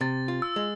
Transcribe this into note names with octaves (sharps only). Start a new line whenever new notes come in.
C3 A6
F4
E6
G#3